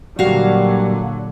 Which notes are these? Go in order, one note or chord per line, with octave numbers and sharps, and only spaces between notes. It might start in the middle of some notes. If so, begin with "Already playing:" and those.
A#2 D3 F#3 G3 F#4 F5